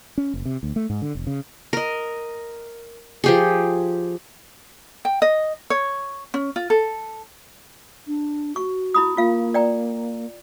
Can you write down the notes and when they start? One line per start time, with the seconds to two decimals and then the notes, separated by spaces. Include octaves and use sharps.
0.18 C#4
0.34 F#1
0.45 C3
0.63 D2
0.76 A3
0.90 G#2
1.02 D3
1.15 F1
1.27 C#3
1.73 A#4 D#5
3.24 F3 G4 G#4
5.05 G5
5.22 D#5
5.70 C#5
6.34 C#4
6.56 F4
6.70 A4
8.07 D4
8.56 F#4 C#6
8.94 E4 B5 D#6
9.17 A#3 F4 F5
9.54 D5 G5 A#5